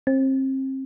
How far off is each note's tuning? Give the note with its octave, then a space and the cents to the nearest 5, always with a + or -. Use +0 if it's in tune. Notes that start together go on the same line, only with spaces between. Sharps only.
C4 +30